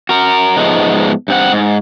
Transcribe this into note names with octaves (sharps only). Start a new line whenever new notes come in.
F#4 A#4
G#2 F3 G#3 A3 B3 D#4
G2 C4 F#5
G#2